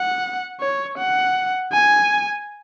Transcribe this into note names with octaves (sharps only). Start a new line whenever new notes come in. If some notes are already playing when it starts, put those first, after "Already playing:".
Already playing: F#5
C#5
F#5
G#5